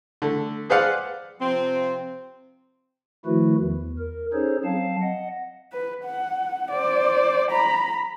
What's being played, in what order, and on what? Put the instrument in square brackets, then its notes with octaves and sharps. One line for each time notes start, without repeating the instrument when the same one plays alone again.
[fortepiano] D3 A3
G#4 B4 C5 D5 F5 F#5
[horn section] C3 F3 C4
[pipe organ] D#3 F3 A3 E4 F#4 B4
E2
A#4
C#4 D#4 G#4 A4 C5 C#5
F#3 C4 F5 A5
D#5 F#5
[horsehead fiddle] B4
F#5
C5 D5
A#5 B5